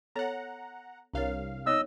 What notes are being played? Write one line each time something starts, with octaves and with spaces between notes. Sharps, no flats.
B3 A4 C#5 F#5 A#5
C2 D4 A#4 C#5 F5
B3 D#4 C#5 D#5 E6